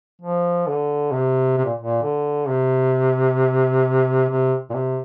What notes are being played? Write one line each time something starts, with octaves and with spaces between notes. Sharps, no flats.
F3
D3
C3
C3
A#2
A#2
D3
C3
C3
A#2
C3